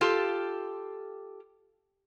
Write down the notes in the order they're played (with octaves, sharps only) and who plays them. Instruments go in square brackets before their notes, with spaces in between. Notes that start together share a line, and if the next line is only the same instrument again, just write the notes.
[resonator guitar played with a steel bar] F4 G4 A4